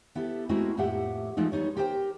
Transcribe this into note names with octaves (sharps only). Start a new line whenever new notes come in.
B3 E4 G4 A4
G#3 A3 C4 E4 F#4 A#4
F2 A2 A#3 G4 E5 F#5
E3 F3 G#3 A3 D#4
G3 B3 D#4 C#5
G4 A#4 C5 C#5 G5